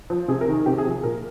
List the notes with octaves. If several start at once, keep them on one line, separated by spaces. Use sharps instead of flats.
F3
C3 G#4
A#4
D#3
G#4
C3 G4
G#4
F3
G#4
A#2 A#4